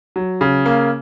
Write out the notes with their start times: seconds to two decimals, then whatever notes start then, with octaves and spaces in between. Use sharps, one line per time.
0.16 F#3
0.41 C#3
0.65 A#3